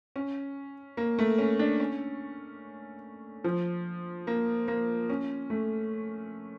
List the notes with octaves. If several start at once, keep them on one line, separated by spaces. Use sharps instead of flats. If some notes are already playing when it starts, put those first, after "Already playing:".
C#4
A#3
A3
C#4
D4
C#4
F3
A#3
A#3
C#4
A3